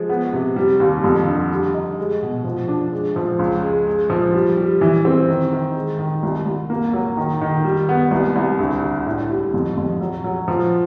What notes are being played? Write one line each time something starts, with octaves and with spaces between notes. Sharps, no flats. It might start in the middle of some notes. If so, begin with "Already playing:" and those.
Already playing: F3 G#3
B3
C3
G3
D#2
F2
D3
G3
D#4
G#3
B2
F3
D4
G#3
F3
C#2
G#3
G#3
F3
G3
G3
E3
C4
D#3
D#3
G#3
D#3
C2
C2
A#3
F#3
D#3
D#3
G3
B3
C2
C2
D2
D3
A2
G3
F2
F2
F#3
F#3
F3